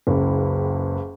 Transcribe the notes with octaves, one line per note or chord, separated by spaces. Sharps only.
F#1 C#2